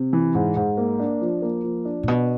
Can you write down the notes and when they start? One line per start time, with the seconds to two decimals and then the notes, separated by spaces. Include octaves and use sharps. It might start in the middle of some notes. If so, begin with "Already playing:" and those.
Already playing: C3
0.13 E3
0.35 G#2
0.56 G#2
0.77 A#3
0.99 D4
1.22 F3
1.42 A#3
1.64 F3
1.85 D4
2.03 A#2
2.08 B2 B3